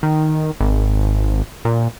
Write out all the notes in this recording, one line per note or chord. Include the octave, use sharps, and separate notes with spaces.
D#3
G#1
A#2